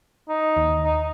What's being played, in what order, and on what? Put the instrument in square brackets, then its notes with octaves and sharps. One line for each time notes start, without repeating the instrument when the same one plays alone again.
[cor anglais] D#4
[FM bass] D#2
[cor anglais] D#4